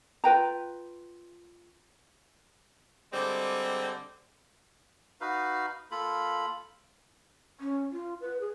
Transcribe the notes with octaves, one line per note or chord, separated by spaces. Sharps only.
F4 B4 G5 A#5
D3 G3 G#3 C4
D#4 F#4 B4 F5
A#3 F4 A4 B5
C#4
F4
B4
G#4